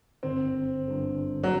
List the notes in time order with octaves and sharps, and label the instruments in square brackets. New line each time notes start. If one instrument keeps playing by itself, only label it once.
[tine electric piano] G1 G2 D3 [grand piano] C4
[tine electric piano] G1 G2 D3
[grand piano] F#3